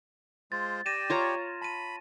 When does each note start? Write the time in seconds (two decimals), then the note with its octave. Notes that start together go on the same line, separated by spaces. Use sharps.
0.52 G#3 F4 C5 A6
0.86 G4 D5 G5 A#6 D#7 E7
1.10 F4 C#5 A#5
1.62 A5 B5 D#7